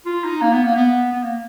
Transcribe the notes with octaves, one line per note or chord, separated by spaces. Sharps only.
F4
D#4
A#3
B3
A#3
B3
B3
A#3